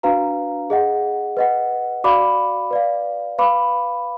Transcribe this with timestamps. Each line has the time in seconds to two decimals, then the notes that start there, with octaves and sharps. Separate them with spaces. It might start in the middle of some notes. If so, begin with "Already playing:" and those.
0.03 D4 F#4 B4 F5 A#5
0.70 G#4 D#5 F#5
1.37 B4 D#5 F#5
2.04 F#4 D5 F5 B5 D6
2.71 B4 D5 F5
3.38 B4 F5 B5 D6